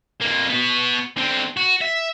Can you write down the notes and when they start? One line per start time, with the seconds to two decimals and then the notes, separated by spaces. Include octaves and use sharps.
0.21 F2 A#3
0.49 B3 F#4
1.17 D3 C4
1.57 F#4
1.81 E5